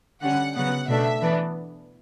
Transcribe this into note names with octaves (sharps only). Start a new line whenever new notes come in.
D3 G3 C#4 F#5
C#3 F#3 B3 F#5
B2 A3 D4 E5
E3 B3 D4